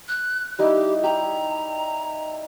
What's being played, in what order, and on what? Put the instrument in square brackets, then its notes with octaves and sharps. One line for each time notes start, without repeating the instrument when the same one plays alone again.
[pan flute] F#6
[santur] G3 D#4 E4 [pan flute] G4
[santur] G4 [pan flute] A#5